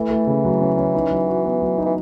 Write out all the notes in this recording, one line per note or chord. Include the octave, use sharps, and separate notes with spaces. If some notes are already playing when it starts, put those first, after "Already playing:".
Already playing: E3 A3 E4
A3
C#3
F#3
C#4
C#4
D#4
F#3
F#4
B3
F#3
D#4
E3